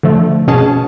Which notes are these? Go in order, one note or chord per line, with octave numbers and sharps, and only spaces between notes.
D3 F3 A3
B2 C#4 G#4 A5